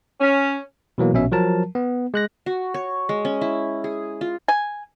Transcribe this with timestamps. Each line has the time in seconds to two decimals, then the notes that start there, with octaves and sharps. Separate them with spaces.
0.20 C#4
0.98 B2 E3 F#3 A#3
1.13 A#1 B2 C#4 E5
1.32 F3 F#3 A#4 A5
1.75 B3
2.14 G#3 F#6 A#6
2.46 F#4
2.74 C#5
3.09 G#3
3.25 C#4
3.41 E4
3.84 G#4
4.21 F4
4.48 G#5